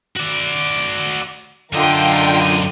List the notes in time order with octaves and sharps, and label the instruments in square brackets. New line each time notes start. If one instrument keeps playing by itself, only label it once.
[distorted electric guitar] F#4 D5
[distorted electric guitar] F#2 D#5 [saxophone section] D3 [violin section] F4 A#4 G5